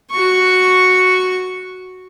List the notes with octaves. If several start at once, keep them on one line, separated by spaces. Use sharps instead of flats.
F#4 C#6